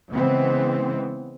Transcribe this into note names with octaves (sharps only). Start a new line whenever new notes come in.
C#3 E3 G#3 B3 C4